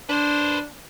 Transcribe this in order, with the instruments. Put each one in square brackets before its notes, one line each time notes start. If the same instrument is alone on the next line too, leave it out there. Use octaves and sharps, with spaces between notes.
[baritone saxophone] D4 [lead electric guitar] B4 C5